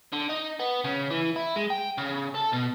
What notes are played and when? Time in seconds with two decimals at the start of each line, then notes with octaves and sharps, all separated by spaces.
0.12 D3
0.29 D#4
0.60 B3
0.85 C#3
1.11 E3
1.36 E4
1.56 G#3
1.70 G5
1.98 C#3
2.34 A4
2.52 B2